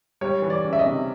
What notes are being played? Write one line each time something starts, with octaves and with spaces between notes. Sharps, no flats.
G3 C#5
E3
D5
C#2
E5
D#5
C3